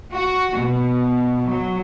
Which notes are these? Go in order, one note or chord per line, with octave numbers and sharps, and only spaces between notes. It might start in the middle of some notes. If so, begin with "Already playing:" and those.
F#4
B2
F#3